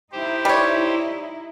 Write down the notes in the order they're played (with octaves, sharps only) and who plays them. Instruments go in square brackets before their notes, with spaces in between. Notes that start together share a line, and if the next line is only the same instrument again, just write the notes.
[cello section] D#4 E4 [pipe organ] G4 C5
[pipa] G3 C#5